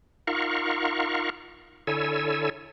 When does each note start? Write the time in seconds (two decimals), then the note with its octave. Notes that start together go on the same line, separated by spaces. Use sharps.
0.27 D#4 F4 A#4 F5 F#5 C#6
1.87 D3 E4 A4 C#5 G#5 E6